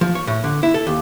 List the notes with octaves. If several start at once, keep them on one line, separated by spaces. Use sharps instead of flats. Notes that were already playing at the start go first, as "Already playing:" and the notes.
F3
C#5
A2
D3
E4
A4
D#2